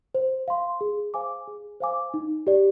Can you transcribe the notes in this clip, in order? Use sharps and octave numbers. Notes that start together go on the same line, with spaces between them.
C5
F5 C6
G#4
C5 F5 G#5 D6
G#4
C5 F5 G#5 D6
D#4
G4 D5